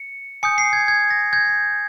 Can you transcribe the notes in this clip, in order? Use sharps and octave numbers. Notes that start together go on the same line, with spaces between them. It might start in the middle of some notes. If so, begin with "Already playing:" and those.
Already playing: C#7
G#5 D#6 G6 C#7
C7
G#6
G#6
A#6
G6 G#6